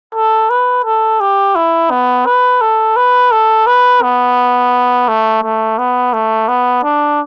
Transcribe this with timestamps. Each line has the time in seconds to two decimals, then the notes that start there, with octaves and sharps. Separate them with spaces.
0.15 A4
0.50 B4
0.85 A4
1.21 G4
1.55 E4
1.91 B3
2.26 B4
2.62 A4
2.97 B4
3.32 A4
3.67 B4
4.02 B3
5.08 A3
5.43 A3
5.78 B3
6.13 A3
6.48 B3
6.83 D4